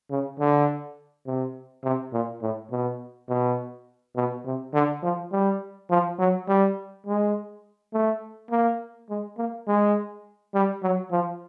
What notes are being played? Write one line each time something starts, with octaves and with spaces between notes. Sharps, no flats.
C#3
D3
C3
C3
A#2
A2
B2
B2
B2
C3
D3
F3
G3
F3
F#3
G3
G#3
A3
A#3
G#3
A#3
G#3
G3
F#3
F3